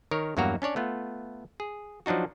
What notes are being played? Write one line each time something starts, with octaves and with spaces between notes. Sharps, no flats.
D#3 A#4 C#5
E2 G2 F#3 A#3 F#4 A#5
C#4 D4 C#5 D5
A3 B3 F4
G#4
F3 F#3 D4 D#4 F#4